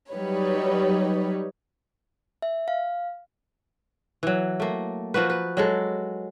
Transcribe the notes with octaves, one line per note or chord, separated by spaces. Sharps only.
F#3 G3 D#4 B4 C#5
E5
F5
E3 F#3
A3 A#3
F3 A#3 F#4 B4
B4
F#3 G#3 A4